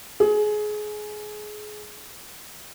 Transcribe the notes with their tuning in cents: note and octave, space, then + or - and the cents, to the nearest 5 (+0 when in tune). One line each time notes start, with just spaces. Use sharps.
G#4 +25